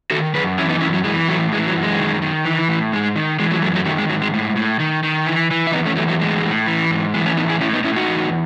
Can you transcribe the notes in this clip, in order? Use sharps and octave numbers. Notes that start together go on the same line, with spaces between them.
D#3 F#4 A4
F#2 G#4 B4
E3 C#4 E4
B3 D#4
F#2 C#4 E4
F#3
E3 G#3
A2 F#3 A3
E3 G#3
F#3
F#2
G#3
D#3
D#3
E3
A2
G#2 G#3
D#3
E3 G#3
F#3 A3
F#2 F#3 A3
F#3 A3
D#3 F#3 A3
G#3
G#2 F#3
G#3
A2
A2
D#3
D#3
E3
E3
E4
E2 B3 D#4
A3 C#4
E2 F#3 A3
F#3 A3
A2 G#3
A2
E3
G#2
E3 G#3
A3 C#4
A2 B3 D#4
E4 G#4
A2 C#4 E4
B3 D#4
A2 C#4 E4
D#4 F#4
E2